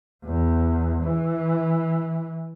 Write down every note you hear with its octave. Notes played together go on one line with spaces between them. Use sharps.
E2
E3